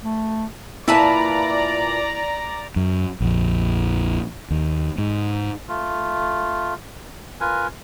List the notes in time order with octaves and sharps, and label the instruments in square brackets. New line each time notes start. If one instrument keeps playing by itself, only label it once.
[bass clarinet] A3
[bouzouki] A#2 B4 A5 [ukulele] E4 E5 [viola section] D5 A#5
[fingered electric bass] F#2
A#1 F2
D#2
G#2
[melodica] A3 F4
F4 A#4 B4 G#5